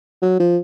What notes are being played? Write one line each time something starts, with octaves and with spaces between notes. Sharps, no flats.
F#3
F3